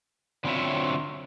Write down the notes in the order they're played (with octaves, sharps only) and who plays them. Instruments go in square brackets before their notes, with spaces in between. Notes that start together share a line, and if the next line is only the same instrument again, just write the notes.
[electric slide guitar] D3 F#3 C4 F4 C#5 E5